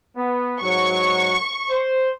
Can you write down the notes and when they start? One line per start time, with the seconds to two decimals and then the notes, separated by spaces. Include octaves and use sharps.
0.16 B3
0.62 G#2 F#3 F#4 C#6
1.70 C5